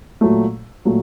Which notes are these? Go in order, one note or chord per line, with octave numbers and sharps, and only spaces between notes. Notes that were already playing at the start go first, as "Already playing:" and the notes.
A#2 F#3 A3
A#2 F#3 A3